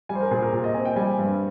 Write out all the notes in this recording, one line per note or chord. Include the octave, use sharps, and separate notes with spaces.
G3 G#5
C5
A#4
A#2 G#4
A#4
A#2
D#5
C4 G#5
G5
G3 G#5
G2